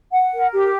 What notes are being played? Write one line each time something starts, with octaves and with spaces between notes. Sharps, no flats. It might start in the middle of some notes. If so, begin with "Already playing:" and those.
F#5
A#4
G4